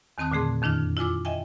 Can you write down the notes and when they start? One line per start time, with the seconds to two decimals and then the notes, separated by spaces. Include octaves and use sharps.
0.18 E2 D#3 C4 A5 D#6 F#6
0.32 A#2 D3 A3 G#4 C6
0.62 F2 D#3 D4 E4 F6
0.97 E4 F4 G#5 D6 E6
1.25 D#5 E5 G5 G#5